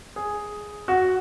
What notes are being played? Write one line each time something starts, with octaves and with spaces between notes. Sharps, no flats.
G#4
F#4